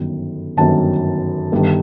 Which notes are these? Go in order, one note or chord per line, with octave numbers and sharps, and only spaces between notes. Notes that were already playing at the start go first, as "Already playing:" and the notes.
Already playing: G1 F#2 D#3
G1 F#2 D#3 A5
G1 G2 D#3